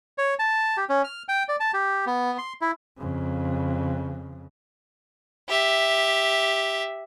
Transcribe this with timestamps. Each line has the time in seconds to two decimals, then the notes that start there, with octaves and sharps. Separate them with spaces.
0.18 C#5
0.39 A5
0.77 G4
0.89 C#4
1.04 F6
1.28 G5
1.49 D5
1.60 A5
1.74 G4
2.06 B3
2.38 C6
2.61 E4
2.97 F2 C#3
5.49 G4 E5